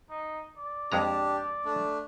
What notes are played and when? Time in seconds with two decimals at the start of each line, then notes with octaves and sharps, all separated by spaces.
0.10 D#4
0.58 D5
0.92 F2 G#3 D4 G4 A#5
1.65 A3 D4